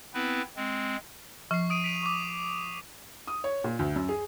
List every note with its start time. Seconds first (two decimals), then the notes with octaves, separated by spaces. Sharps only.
0.14 B3 C4 E4 B4
0.56 G#3 C4
1.51 F3 C#6 C7
1.70 D#6 D7 D#7
1.84 B6 D7 F7
2.03 C#6 D6
3.27 D#6
3.44 C#5
3.64 A#2
3.79 D2
3.96 F#2
4.09 G#4